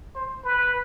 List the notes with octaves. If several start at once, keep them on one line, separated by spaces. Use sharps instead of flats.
C5
B4